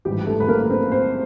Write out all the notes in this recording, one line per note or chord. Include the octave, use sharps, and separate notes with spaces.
A1 G#2 E3 G3 G4
A3 A4
B4
A#3 A#4
C4 C5
C4 C5